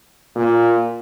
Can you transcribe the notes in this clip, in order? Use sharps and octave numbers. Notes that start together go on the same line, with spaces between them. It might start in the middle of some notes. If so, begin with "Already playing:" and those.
A#2